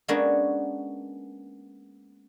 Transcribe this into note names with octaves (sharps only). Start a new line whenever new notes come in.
G#3 A#3 B3 C#4 D4 F#4